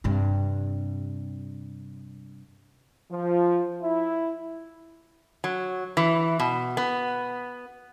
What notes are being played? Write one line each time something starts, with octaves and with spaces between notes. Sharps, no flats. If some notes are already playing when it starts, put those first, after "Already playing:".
G2 C3
F3
E4
F#3
E3
B2
B3